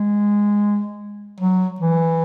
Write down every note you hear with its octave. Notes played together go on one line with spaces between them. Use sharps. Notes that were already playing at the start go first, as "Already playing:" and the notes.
Already playing: G#3
F#3
E3